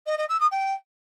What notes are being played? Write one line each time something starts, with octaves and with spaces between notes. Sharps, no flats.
D#5
D#5
E6
D#6
G5